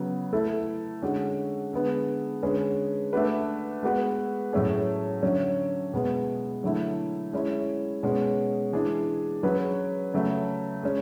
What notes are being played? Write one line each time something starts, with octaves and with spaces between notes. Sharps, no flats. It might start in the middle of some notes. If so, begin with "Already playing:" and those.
Already playing: C#3 F#3 B3
A3 E4 A4
D3 G#3 C#4 F#4
D3 G#3 B3
D3 G#3 C#4 G#4 B4
A3 D4 F#4 B4
G#3 B3 F#4 B4
A2 F#3 A3 C#4 G#4
D3 F#3 C#4
B2 G#3 B3
D3 F#3 A3 E4
G#3 C#4 E4
B2 G#3 C#4
E3 G#3 D4 G#4
F#3 C#4 G#4 B4
C#3 F#3 A3
G#3 C#4